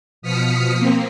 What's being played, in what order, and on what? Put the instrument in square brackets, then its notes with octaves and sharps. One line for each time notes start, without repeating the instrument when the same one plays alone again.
[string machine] B2 F3 D#6 F6 B6 C#7
A#3 C4